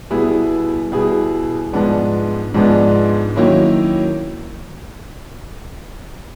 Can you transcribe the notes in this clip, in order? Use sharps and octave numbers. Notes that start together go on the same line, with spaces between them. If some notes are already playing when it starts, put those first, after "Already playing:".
B2 G3 B3 E4 G#4
B2 G3 B3 E4 G#4
G#2 F3 G#3 B3 D4
G#2 F3 G#3 B3 D4
D#3 F#3 A#3 C#4 E4